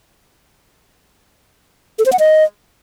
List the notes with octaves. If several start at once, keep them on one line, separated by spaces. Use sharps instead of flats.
A4
C5
F#5
D#5